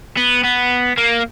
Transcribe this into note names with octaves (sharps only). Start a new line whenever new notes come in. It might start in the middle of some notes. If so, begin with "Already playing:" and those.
B3
B3
A#3